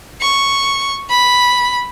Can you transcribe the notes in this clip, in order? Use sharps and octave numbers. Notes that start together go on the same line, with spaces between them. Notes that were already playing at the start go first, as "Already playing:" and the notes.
C#6
B5